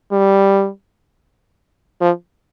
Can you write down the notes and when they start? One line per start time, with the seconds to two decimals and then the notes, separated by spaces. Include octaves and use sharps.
0.12 G3
2.01 F3